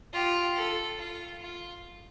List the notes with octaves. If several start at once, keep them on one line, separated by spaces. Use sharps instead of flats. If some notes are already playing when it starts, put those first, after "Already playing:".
F4 G4
A4
F4
F4